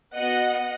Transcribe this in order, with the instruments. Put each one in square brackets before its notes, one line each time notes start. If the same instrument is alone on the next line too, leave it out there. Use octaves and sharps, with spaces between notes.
[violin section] B3 F#4 D#5 F#5